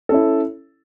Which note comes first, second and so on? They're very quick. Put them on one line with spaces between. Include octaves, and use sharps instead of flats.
A4 C#4 E4